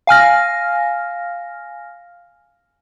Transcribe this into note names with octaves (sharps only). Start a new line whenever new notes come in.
F5 G#5 F6 A#6